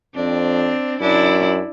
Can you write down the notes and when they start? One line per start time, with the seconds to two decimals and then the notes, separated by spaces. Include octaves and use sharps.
0.15 F2 C4 D4
1.00 F#2 D4 E4